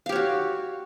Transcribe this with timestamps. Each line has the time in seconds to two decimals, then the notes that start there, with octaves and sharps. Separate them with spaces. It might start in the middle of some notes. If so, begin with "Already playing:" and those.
0.06 F5
0.09 G4
0.12 C#5
0.16 F#4